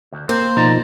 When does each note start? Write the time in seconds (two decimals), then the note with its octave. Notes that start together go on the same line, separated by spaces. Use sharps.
0.12 D2
0.29 A#3 C4 C5
0.57 C#2 B2 F3 D#4 D5 A#5